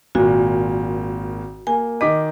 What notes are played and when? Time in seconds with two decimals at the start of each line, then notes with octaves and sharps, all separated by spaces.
0.15 G#1 A#2 F#4
1.67 A#3 G#5
2.01 D#3 D#5 D6 B6